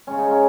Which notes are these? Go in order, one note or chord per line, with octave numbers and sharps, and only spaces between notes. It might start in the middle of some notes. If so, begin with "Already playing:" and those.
C#3 G#3 C#4
D#4
C#4